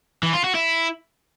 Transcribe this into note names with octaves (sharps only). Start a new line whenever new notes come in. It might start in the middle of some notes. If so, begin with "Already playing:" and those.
E3
F4
F#4
E4